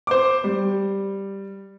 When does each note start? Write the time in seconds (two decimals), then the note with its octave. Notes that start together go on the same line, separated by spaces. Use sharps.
0.07 C5 D6
0.44 G3